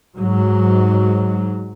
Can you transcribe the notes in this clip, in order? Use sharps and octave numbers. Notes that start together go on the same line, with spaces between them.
G#2 F#3